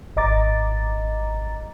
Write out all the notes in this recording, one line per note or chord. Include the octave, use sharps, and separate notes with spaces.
G#1 D#5 A#5 D6 A6